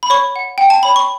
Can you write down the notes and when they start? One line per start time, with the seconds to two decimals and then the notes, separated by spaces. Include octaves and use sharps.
0.03 B5
0.10 C#5 C#6
0.36 F#5
0.58 F#5 G5
0.70 A5
0.83 C#5 B5
0.96 C#6